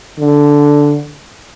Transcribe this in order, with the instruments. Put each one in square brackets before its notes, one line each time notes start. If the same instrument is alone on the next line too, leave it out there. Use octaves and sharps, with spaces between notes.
[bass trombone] D3